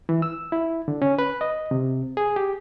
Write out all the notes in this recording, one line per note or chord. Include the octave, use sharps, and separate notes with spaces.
E3
E6
E4
D3
C#4
B4
D#5
C3
G#4
G4